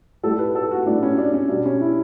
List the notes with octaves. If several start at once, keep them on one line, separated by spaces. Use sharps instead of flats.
A2 G3 A4
B4
A4
F#4
A2 G3 D4
C#4
D4
C#4
B2 G3 D4
C#4
E4